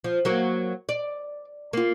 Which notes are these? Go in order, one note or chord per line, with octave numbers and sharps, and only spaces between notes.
F3
F#3 A#3 F#4
D5
A#3 F4